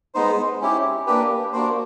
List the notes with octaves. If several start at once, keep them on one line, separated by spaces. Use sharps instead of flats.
G#3 B3 D#4 C5
C#4 E4 G4
A#3 D4 G4 B4
A#3 D4 F#4 C5